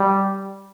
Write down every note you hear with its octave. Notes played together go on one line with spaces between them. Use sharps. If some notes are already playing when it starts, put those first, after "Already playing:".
Already playing: G3